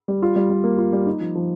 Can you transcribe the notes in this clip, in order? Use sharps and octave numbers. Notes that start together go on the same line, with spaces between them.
G3
F4
G3
G3
A#3
F4
G3
D#4
F3
F3